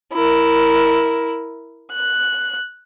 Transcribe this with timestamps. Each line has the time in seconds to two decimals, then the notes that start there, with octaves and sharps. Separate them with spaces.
0.12 E4 A#4
1.91 F#6